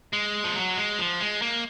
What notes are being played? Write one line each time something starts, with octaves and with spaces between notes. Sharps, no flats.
G#3
F3
F#3
G#3
F3
G#3
A#3